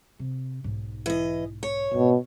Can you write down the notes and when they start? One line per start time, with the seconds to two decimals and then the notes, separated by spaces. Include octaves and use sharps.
0.19 C3
0.64 B1 G#2
1.06 E3 D#5
1.63 C#5
1.94 G#2 B2